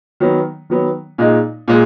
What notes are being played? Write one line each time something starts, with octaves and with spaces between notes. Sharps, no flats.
D#3 F#3 B3
D#3 F#3 B3
A#2 G#3 D#4
A#2 G#3